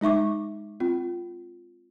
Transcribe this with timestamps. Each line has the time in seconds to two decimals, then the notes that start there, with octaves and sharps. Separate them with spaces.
0.01 G#3 D#4 E5 C#6 D6
0.80 C4 F4